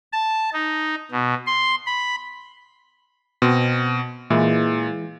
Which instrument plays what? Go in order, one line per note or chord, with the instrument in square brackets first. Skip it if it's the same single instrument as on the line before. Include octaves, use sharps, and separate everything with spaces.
[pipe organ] A5
D#4
B2
C6
B5
[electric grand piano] B2 [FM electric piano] C4
[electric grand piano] A#2 [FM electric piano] E3 G#3